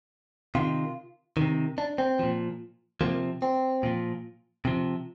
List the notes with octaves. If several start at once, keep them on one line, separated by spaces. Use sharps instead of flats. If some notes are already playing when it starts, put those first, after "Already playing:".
C3 D#3 F4
C3 D#3
D4
C4
A#2 F3
C3 F3 A#3
C4
A#2 F3
C3 F3